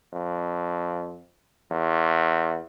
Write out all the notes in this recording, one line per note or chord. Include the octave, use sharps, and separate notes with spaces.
F2
E2